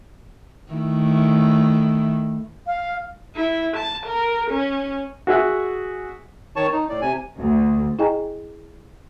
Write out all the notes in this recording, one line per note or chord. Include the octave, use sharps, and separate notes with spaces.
D#3 A3 E4
F5
E4
A5
A#4
C#4
F#4 G#4 E5 F#5
D#3 C#5 A5 C#6
D#4
A2 D5
C3 G#5
D2
E4 G#4 D#5 G5 G#5 A#5